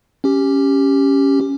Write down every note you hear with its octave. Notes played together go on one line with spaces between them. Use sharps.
C#4 G4